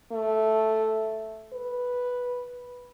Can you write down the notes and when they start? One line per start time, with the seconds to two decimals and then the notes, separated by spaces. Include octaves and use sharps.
0.12 A3
1.53 B4